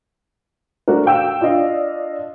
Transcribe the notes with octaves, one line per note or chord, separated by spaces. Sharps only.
A3 D4 F#4 A#4
F5 G5 E6 E7
D4 F4 D5 D#5 F5